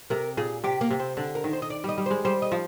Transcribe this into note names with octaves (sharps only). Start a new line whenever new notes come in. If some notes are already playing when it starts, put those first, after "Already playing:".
C3 A#4
A#2 G#4
C3 G4
A#3
C3
C4
D3 D4
A#4
D#3
C5
D#5
D5
G3 D#5
G3
G#3 C5
G3 C5
D#5
F3